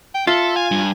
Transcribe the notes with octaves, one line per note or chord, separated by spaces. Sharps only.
G5
F4 A4 E5
F5 G#5
G2